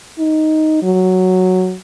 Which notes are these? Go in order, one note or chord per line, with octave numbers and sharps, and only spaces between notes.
D#4
F#3